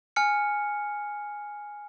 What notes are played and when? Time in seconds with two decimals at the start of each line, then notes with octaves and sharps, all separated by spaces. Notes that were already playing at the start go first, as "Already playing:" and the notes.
0.16 G#5 F6 C#7